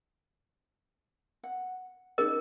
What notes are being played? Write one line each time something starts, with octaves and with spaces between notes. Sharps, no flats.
F#5
C#4 D#4 G#4 A#4 D#5